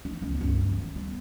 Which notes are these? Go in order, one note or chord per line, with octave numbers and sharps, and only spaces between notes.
D#4
C#2 B3
C#2 G2
G2
D#3
G3 B3